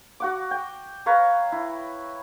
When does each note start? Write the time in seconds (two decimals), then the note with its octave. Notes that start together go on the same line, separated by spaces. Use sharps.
0.20 F#4 F#5 D6
0.51 G5
1.06 B4 C#5 F5 A#5
1.52 E4